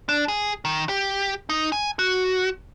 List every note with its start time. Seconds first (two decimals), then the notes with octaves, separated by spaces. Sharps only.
0.09 D4
0.28 G#4
0.65 D#3
0.89 G4
1.49 D#4
1.72 G#5
1.99 F#4